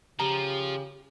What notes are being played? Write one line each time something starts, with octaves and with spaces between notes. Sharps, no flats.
C#3 F3 G4 A#5